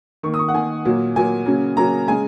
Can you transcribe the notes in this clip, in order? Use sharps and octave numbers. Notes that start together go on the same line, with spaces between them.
D#3 A#3 C#6
D#6
C#6
F#5
D#3 A#3 G#5
A#2 F#3 A#3
A#2 F#3 A#3 G#5
C#3 F#3 A#3
C#3 F#3 A#3 A#5
C#3 G#3 G#5